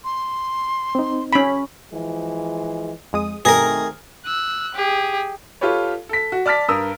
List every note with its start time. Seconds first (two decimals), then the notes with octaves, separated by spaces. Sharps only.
0.04 C6
0.95 C4 D#4
1.33 C#4 B5
1.92 E3 F3 G#3
3.13 F2 G#3 D#6
3.45 G2 B2 D#3 A3 C4 G#4 A#4 A#5
4.25 E6 F#6
4.75 G4 G#4
5.61 F4 G4 A4 B4 C#5
6.09 A4 B6
6.32 F#4
6.46 D5 A5 F6 A6 B6
6.68 G2 A#4 D#6 E6